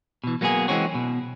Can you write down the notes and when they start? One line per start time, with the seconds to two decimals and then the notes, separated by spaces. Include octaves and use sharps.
0.24 B2 E3
0.41 F#3 A#3 B3 F#4 G#4
0.68 E3 F3 G#3 C4 C#4 F#4
0.95 B2